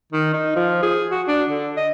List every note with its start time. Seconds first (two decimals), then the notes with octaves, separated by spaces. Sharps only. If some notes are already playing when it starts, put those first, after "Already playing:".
0.13 D#3
0.34 D#4
0.56 F3
0.83 G#4
1.11 F#4
1.28 D4
1.49 D3
1.77 D#5